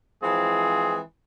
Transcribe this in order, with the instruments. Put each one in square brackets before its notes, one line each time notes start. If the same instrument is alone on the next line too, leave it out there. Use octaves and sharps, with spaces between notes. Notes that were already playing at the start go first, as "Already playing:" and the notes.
[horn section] E3 F3 G#3 C4 G#4